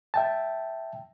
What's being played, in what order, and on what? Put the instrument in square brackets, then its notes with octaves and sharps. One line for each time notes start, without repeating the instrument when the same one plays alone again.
[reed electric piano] E5 G5 A5